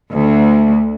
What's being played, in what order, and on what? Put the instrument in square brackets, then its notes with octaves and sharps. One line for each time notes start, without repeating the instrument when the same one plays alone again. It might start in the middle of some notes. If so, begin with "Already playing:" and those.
[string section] D2